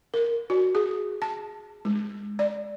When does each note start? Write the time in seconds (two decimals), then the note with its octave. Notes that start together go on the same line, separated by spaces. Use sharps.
0.14 A#4
0.50 F#4
0.75 G#4
1.22 A5
1.85 G#3
2.39 D5